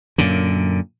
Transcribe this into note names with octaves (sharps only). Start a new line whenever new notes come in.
F#2 A#2 D3